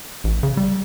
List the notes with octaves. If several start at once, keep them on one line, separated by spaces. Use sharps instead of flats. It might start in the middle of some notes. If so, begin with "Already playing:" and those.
A1
C#3
G3